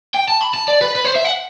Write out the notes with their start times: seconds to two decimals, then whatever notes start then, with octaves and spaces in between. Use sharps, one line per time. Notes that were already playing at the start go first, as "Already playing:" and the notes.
0.14 G5
0.28 A5
0.41 B5
0.54 A5
0.68 D5
0.81 B4
0.95 B4
1.04 C5
1.15 E5
1.24 F#5